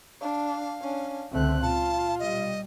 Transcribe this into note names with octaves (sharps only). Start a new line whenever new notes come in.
D4 F5
C#4 D4
C#2 D3 A3 C4 F#6
A#2 F4 A5
B2 G3 D#5